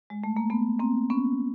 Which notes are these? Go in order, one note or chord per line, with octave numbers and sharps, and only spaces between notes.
G#3
A3
A#3
A3 B3
A#3 C4
B3 C#4